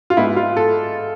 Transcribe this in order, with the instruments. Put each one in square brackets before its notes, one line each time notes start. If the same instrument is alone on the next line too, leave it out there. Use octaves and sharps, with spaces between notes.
[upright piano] F4
G#2 G#3 B3 E4
F4
A4